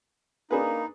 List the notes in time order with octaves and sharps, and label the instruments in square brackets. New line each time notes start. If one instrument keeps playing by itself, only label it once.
[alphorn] A#3 [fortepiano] D4 G#4 B4 [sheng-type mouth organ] D#4